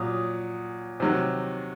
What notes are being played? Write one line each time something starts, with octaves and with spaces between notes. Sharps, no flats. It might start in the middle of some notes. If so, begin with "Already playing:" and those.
Already playing: A#2 F#3 D#6
C3 D#3 F#3